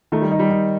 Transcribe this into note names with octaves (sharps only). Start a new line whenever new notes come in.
D#3 A3
G3
D#4
G3
D#3